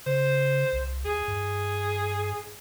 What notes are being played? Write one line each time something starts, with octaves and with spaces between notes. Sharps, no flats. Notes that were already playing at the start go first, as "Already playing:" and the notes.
C#3 C5
C2
D#2 G#4
G2